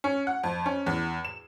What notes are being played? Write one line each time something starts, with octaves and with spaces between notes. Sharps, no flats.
C#4
F#5
F2
C#4
E2
E7